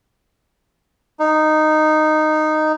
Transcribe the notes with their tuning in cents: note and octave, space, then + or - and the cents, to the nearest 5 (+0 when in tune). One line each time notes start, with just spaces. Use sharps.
D#4 -10